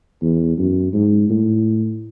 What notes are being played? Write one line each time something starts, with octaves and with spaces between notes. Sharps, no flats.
E2
F#2
G#2
A2